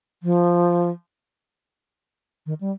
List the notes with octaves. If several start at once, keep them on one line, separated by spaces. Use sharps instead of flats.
F3
D#3
G3